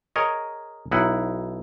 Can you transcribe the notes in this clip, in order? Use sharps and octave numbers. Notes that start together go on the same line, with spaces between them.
G#4 A#4 C#5 D#5
B1 D#4 E4 F#5